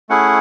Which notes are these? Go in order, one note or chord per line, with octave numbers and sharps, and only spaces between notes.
A3 C#4 E4 G#4 F#5